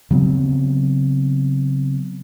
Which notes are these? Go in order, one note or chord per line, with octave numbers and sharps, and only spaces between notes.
C#3 F#3 B3 C4